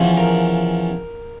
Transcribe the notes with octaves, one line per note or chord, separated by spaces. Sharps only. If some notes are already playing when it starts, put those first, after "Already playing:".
Already playing: E2 C#3 F3
A#4